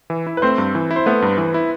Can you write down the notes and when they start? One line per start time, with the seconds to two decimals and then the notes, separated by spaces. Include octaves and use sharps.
0.10 E3
0.27 E4
0.37 B4
0.42 A3 C4 C5
0.58 G2
0.75 E3
0.91 E4
0.96 C5
1.06 A3 B3 B4
1.22 G2
1.38 E3
1.54 E4